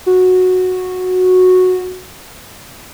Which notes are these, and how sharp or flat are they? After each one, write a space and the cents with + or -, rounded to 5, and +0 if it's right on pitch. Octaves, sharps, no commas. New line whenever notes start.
F#4 -10